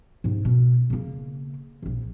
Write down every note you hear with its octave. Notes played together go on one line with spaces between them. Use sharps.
G#2 C3
B2 C#4
C#3 A#3
E1 A#1